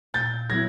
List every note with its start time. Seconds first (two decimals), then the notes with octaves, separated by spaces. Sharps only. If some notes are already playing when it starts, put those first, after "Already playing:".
0.14 A#2 G6 A6
0.50 F#3 B3 E4 G#6 A#6